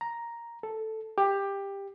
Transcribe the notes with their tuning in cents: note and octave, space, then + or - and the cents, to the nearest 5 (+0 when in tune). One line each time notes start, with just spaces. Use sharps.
A#5 +5
A4 +0
G4 +15